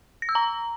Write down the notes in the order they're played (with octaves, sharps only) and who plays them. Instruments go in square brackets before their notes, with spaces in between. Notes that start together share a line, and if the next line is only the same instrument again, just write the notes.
[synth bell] A#6
E6
A#5